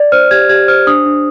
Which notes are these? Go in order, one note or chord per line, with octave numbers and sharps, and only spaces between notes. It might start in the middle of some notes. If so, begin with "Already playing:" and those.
Already playing: D5
C5 F6
G4 G#6
G4 G#6
C5 F6
D4 D#6
D4